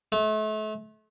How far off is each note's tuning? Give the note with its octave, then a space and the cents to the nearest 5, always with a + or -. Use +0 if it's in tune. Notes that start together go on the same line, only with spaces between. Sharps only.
A3 -35